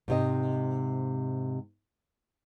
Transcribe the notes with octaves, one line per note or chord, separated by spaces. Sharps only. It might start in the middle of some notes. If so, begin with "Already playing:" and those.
G#2 C3 D#5